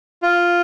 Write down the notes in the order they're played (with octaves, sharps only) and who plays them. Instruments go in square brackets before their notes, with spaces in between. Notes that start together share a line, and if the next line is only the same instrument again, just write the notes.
[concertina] F4